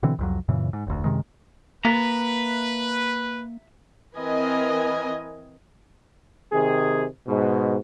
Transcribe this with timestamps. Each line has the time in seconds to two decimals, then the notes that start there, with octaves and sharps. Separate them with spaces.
0.03 B2 D3 E3 C4
0.19 C2 F2 F#3
0.48 F#2 A#2 C#3 E3
0.73 G#2
0.87 F1 D2
1.04 F#2 C3 D#3 G#3
1.85 A#3 B4 E5 A#5
4.16 E3 C4 A#4 B4 D#5 G#5
6.52 C3 D#3 G#4
7.28 G#2 B2